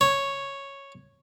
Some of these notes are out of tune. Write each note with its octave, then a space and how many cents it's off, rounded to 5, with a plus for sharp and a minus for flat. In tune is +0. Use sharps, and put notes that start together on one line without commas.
C#5 -5